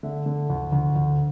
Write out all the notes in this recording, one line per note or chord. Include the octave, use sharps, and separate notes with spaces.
D3 E5
D3
D2
D2
D2